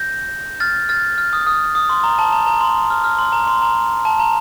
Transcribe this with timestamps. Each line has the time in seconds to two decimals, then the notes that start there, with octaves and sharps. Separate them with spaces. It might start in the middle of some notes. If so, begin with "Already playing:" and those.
Already playing: G6 A#6
0.60 F6 A6
0.89 F6 A6
1.18 F6
1.33 D#6
1.47 D#6
1.75 D#6
1.89 C6
2.04 A#5
2.19 A5
2.32 A#5
2.47 A#5
2.61 C6
2.90 F6
3.04 F6
3.19 C6
3.32 A#5
3.47 C6
3.62 A#5
4.05 A5
4.20 A#5